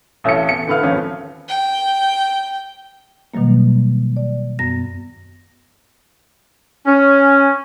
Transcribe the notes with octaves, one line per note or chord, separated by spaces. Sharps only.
A1 A2 C#5 F5 C#7
E2 C#7
A2 D3 B4 F5 F6
G#1 D#2 F3 C#4
G5
B2 D#3 F#3 G3 A#3
D5
F#2 B3 A#6
C#4